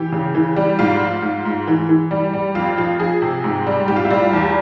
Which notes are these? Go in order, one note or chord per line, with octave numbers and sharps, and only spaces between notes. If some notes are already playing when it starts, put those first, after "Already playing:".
Already playing: E3 G4
C#3
E3
G3
G#2 F4
F3
G#2
G#2
E3
E3
G3
G3
F2 F4
F3 F4
F3 G#4
C3
G#2
G3
G#2 G4
F4
E4
G3 F4
E2